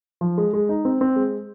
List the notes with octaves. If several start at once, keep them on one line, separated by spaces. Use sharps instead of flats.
F3
G#3
G#3
D#4
C4
C4
G#3